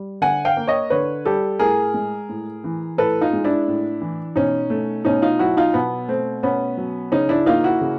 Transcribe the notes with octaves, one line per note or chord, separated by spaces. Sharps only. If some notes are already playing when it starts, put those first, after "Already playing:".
Already playing: G3
D3 F#5 G#5
F5 G5
A#3
C#5 D#5
D3 B4 C#5
G3 G4 A4
A2 G#4 A#4
G#3
A2
E3
A2 A4 B4
D#4 F4
G#3
D4 E4
A2
E3
B2 C#4 D#4
A3
B2 C#4 D#4
D#4 F4
F#3 E4 F#4
D#4 F4
B2 B3
A3 C4
B2 B3 C#4
F#3
C#3 C#4 D#4
D4 E4
A#3 D#4 F4
E4 F#4
C#3